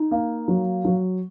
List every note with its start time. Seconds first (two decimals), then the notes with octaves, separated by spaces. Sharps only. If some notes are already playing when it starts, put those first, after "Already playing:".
Already playing: D#4
0.11 A#3
0.48 F#3
0.85 F#3